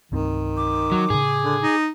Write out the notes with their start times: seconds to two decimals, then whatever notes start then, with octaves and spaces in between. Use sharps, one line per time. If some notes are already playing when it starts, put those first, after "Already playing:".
0.12 C2 G2 D#3 C4
0.57 D6
0.92 F#3
1.10 A2 C#3 G#4
1.44 D3
1.62 D#4